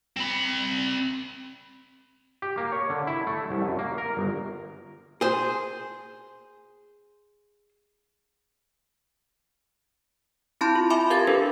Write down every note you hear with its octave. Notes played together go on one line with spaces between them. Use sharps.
C4 B5
G4
A#3
C#5
D3
E4
A3
C2
F#2
A#3
A#4
G1
G#4 C5
C4 E4 A5 B5 C6 G6
F4
E5 G#5 B5 C6 D6
G4 A#4 F5 G#6 A6
D4 G4 A4 B4